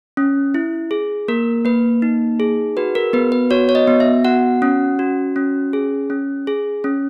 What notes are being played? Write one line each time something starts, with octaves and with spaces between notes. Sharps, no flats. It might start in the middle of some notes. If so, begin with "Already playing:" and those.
C#4
E4
G#4
A#3 A#4
A#3 B4
D#4
G#4
F#4 B4
A#4
B3 B4
B4
F#4 C#5
C#5
D#5
B3
E5
F#4 F#5
C#4
F#4
C#4
G#4
C#4
G#4
C#4